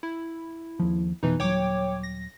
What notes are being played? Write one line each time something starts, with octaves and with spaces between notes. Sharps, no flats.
E4
D#2 F3
F1 B2 E3 D#4
D#1 F#3 C#5 G5 D6
A#6